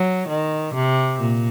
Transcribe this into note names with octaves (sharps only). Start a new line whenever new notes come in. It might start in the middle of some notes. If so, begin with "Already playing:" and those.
Already playing: F#3
D#3
C3
A#2